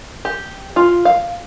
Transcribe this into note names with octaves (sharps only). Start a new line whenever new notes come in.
G4
F4
F5